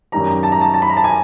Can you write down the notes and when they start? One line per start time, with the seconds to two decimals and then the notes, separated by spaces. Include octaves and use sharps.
0.12 F#2 D#3 G3 A#5
0.43 A5
0.52 A#5
0.61 A5
0.74 A5
0.82 B5
0.90 A#5
0.97 A5
1.04 G#5